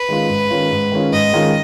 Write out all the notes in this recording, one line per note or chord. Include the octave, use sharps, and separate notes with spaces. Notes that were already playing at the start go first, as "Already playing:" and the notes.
Already playing: B4
D#3 G#3 C#4 F4
G#2
D#3 G#3 C#4 F4
G#2
D#3 G#3 C#4 F4
G#2 D#5
D#3 G#3 C#4 F4